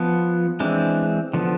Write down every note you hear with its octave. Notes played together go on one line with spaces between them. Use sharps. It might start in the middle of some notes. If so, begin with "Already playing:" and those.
Already playing: F3 B3
E3 G#3 C4 D4
D3 F3 B3